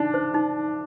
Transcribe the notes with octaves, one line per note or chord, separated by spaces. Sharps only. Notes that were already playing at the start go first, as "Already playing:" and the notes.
Already playing: D4 D#4
C5
D#4